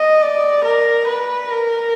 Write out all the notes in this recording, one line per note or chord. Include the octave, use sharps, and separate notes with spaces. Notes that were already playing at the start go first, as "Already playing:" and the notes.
Already playing: D#5
D5
A#4
B4
A#4